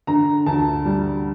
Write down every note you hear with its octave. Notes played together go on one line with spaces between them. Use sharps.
D3 A#5
D2 A5
G3